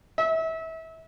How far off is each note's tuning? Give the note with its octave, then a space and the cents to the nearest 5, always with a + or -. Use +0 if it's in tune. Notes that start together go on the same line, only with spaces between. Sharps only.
E5 -30